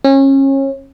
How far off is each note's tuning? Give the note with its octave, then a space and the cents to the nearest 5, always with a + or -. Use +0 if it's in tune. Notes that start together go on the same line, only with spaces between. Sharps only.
C#4 -30